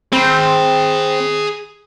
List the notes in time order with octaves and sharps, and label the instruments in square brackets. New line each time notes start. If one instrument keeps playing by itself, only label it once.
[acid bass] C4 [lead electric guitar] G#4 B5